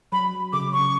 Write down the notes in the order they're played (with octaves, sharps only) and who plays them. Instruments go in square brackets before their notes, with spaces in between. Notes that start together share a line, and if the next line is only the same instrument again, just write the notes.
[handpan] F#3 [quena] B5
[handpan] C#3 [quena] D6
[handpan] C#3 [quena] C#6